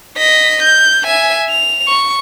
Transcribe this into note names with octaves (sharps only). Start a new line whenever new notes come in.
D#5 B6
G6
E5 G#5
F7
C#6